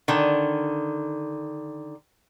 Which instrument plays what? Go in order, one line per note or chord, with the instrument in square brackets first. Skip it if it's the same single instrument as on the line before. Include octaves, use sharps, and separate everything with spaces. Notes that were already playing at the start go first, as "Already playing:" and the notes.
[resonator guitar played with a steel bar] D3 D#3